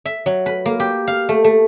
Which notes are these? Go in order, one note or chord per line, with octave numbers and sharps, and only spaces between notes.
E5
F#3
B4
A#3
G4
F5
A3
A3